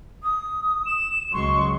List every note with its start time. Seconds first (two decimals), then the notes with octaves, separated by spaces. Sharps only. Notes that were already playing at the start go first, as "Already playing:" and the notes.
0.23 D#6
0.86 E7
1.33 C#2 F#3 G#3 C6 C#6